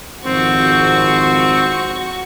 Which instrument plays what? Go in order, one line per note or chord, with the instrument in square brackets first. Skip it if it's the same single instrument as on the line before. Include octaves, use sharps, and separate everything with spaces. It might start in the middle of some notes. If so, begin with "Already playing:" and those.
[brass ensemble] G#1 F2 [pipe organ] C4 [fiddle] F#4 C#6